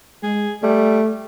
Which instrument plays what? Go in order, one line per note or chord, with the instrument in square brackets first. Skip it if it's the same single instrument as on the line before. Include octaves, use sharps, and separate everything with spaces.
[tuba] G#3 [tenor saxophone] G#4
[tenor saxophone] G3 [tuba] A3